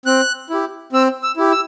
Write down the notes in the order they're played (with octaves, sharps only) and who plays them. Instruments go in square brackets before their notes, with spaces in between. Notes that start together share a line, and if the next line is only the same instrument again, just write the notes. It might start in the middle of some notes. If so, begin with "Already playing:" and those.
[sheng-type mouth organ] C4 F#6
E4 G4
C4 E6
E6
E4 G4
E6